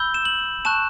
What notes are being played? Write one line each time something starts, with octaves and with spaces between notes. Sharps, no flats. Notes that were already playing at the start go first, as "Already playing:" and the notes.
Already playing: B5 E6 G6 G7
E7
F#7
A5 C#6 F#6 E7